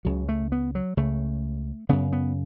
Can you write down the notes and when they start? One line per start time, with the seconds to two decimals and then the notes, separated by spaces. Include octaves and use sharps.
0.05 C#2 C#3 F#3
0.29 A3
0.52 B3
0.75 F#3
0.97 C#2 C#3 A3
1.89 F#2 C#3 B3
2.13 B3